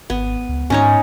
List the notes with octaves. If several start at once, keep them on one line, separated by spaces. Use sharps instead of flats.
G#1 B3
C#2
G#2 C#4 D#4 C#5